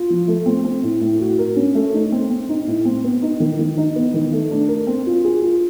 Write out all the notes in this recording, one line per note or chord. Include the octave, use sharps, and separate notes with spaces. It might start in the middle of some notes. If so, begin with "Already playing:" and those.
Already playing: F4
F3
A3
C4
C4
A2
A2
F#4
A#4
C#4
A3
D#4
C4
C4
D#4
A2
C4
B3
D#4
D#3
D#3
D#4
B3
D#3
A3
D4
A#4
C4
F4
G#4
F4